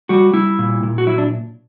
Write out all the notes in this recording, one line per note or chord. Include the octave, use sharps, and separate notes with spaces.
G3 F#4
G3 E4
A#2
A#2
F#4
F#3 E4
D4